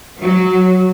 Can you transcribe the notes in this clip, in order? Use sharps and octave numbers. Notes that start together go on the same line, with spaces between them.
F#3